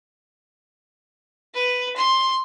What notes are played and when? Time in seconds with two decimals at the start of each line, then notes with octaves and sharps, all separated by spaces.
1.54 B4
1.96 C6